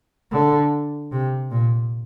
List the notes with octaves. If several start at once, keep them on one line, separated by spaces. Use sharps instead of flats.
D3
C3
A#2